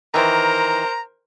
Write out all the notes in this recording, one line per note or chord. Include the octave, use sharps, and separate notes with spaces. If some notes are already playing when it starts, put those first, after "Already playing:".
D#3 E3 A#4 C5 A#5